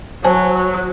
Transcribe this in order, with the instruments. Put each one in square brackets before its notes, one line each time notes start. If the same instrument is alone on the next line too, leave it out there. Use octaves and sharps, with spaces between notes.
[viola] F#3 [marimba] C5 G#5 A5